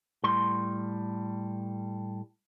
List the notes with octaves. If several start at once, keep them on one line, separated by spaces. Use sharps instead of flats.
A2 G3 C6